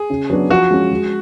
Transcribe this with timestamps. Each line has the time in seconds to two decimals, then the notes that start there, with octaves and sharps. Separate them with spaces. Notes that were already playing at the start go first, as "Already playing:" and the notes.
Already playing: G#4
0.10 C#3
0.30 F#3 B3 D4 F#4
0.50 F3 F#4
0.71 G#3 C#4
0.91 G#3